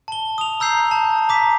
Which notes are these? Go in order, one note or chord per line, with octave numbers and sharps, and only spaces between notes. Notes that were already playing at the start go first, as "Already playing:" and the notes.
A5 G7
D#6 F7
A#5 E6 G6 C7
A5
A#5 D6 B6